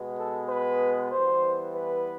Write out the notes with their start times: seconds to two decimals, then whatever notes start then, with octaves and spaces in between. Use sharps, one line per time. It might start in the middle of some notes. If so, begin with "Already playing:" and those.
Already playing: B2 G#3 B3
0.18 A4
0.49 B4
1.11 E3 G3 B3 C5
1.74 B4